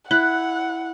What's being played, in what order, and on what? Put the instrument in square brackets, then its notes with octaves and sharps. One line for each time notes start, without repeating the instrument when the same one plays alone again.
[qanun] E4 [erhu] F#5 [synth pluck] F#6